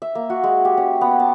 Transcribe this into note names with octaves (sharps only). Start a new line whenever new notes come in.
E5
A#3
F#4
G#3
G4
C#4
B3
A5